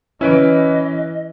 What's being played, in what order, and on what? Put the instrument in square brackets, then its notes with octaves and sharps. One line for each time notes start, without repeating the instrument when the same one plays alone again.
[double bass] E3 [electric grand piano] C#4 B4 D7 [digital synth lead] E4 [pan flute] D#5